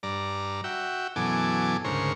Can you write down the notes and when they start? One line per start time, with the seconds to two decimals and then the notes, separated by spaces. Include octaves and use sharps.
0.03 G2 D5 A#5
0.64 F#4 E5 G5
1.16 F#2 B2 E3 A4 G#5 D6
1.84 D2 G#2 C#3 A#4 C5 C#6